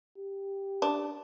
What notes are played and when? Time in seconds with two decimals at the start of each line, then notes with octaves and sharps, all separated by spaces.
0.17 G4
0.82 D4